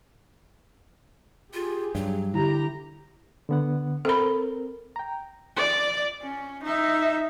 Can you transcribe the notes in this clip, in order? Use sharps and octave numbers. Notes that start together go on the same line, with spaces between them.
F4 G4 G#4
G2 F#3
D3 E4 G4 A#5
D3 B3 F#5
C4 A4 A#4 B5
G5 A#5
D5
C#4
D#4 E5